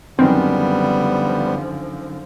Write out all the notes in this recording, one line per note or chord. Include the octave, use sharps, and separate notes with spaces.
F#2 D3 D#3 F3 G3 B3 C4